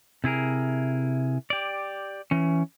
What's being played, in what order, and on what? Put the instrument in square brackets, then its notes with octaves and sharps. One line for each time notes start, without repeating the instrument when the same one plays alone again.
[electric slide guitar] C3 E4 G#4 A#4
G4 D5
E3 C#4